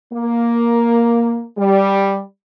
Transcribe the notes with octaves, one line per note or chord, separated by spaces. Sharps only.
A#3
G3